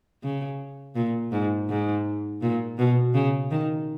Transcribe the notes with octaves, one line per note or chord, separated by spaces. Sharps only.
C#3
A#2
G#2
G#2
A#2
B2
C#3
D#3